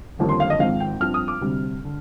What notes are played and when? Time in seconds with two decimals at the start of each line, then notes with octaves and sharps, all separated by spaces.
0.19 G1 F2 D#3 G3 A#3
0.29 C6
0.40 F5
0.50 D#5
0.59 G#1 G#2 F3 C4 F5
0.80 G5
1.00 G2 F3 C4 F6
1.14 D#6
1.28 D6
1.41 D2 C3 G3 C4
1.84 D3